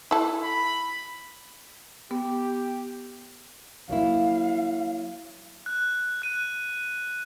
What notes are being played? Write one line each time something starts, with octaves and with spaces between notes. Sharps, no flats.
E4 A4
B5
B3 G4
F#3 A#3 E4 F5
F#6
F#6 D#7